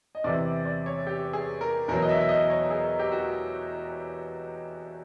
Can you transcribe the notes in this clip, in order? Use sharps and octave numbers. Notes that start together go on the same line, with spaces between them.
D#5
E2 C3 E3 D5
D5
C#5
G4
G#4
A#4
E2 B2 F#3 A#4
D#5
E5
E5
D#5
C#5
G#4
G4
F#4